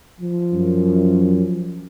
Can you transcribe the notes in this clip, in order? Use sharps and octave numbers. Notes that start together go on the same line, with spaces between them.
F3
F#2